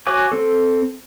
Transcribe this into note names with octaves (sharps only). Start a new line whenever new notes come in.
F#4 C#5 G#5 D6
C4 A4